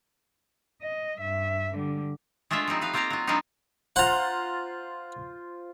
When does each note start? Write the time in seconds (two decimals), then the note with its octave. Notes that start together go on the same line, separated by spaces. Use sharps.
0.82 D#5
1.19 G2 E5
1.75 D3 G3
2.51 G#3 A3 D4 F4 E5
2.68 F3 G3 C4 D#4
2.81 D#4 B4 F5
2.93 A#3 C4 F4 G4 F5 A#5
3.10 F#3 F4
3.27 F3 G3 A#3 C4 D4 D#4
3.96 F4 C5 F#5 A#5